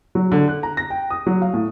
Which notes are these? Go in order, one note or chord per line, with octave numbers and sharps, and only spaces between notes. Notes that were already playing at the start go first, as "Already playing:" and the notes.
F#3
D3
F#6
A#5
A#6
G5
D#6
F#3
F5
A2